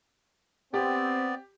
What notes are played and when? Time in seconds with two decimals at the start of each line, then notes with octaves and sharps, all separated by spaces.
0.74 B3 C4 G4 D5